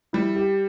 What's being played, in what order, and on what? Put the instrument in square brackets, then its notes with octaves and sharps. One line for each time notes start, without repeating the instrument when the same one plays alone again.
[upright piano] G3 [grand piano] E4
[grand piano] G4